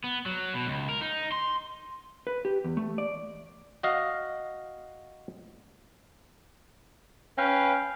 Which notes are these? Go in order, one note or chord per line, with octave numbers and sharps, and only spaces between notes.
B3
F#3
B2
C#2
A#4
D#4
C6
B4
G4
E2
A3
D5
F#4 D#5 F5
C#4 B4 F5 G5